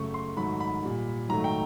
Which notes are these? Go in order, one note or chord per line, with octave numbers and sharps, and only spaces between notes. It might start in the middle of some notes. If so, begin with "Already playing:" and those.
Already playing: F#2 C#3 F#3 A3 C#6
C6
G#2 D#3 F#3 A3 B5
B5
A#2 G3
G#2 D#3 F#3 A3 A#5
G5